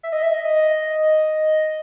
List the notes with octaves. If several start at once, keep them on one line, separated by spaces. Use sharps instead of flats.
E5
D#5
E5
D#5
D#5